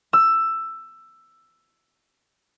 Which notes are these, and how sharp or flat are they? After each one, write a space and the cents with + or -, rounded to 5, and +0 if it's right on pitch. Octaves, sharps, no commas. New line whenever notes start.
E6 +10